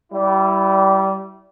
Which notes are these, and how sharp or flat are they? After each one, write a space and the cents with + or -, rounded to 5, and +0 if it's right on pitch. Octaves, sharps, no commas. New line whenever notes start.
G3 -25 E4 +0